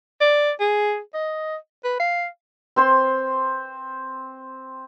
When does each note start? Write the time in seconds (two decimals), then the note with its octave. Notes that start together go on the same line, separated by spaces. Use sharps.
0.21 D5
0.60 G#4
1.14 D#5
1.84 B4
1.99 F5
2.76 C4 C5 C6